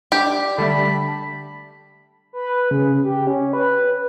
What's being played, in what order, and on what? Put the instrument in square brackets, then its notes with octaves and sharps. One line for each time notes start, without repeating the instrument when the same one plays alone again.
[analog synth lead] D4 [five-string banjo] G4
[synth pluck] D3 G3 A3 [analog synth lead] A5 [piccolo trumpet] B5
[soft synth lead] B4
C#3
G4
C#4
B4